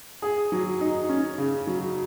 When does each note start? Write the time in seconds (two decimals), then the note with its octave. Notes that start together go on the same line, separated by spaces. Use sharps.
0.22 G#4
0.52 F#3
0.81 D#4
1.09 C#4
1.38 C#3
1.67 F#3